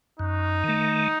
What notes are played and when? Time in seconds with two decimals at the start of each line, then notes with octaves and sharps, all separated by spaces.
0.19 F#2 D#4
0.64 D#3 A3